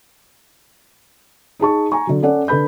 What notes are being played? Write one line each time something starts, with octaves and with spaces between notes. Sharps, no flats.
D#4 G#4 A5 C#6
G#5 A#5 C#6
D3 F#3
C#4 A4 D5 F#5
D3 A4 B4 B5 G6